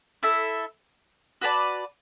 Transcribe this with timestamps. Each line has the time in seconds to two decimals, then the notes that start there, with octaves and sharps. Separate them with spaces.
0.23 E4 A4 E5
1.41 F#4 B4 D5 A5